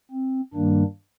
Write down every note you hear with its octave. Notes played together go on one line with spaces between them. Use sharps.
C4
G2 D#3 G3 A#3 D4